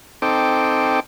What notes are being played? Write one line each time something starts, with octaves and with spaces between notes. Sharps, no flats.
C4 D#4 A4 G5 D6